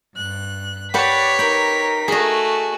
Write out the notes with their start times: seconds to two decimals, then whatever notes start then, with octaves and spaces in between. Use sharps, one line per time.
0.15 G2 F#6
0.94 G4 B4 C#5 D5 F#5 B6
1.39 D#4 A#4 G5 B5
2.08 A3 F#4 G#4 D#5